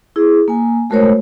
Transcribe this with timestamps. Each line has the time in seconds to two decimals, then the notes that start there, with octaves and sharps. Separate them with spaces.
0.16 E4 G#4
0.48 A#3 G#5
0.90 G#3 A3 F#4 A#4 C5 C#5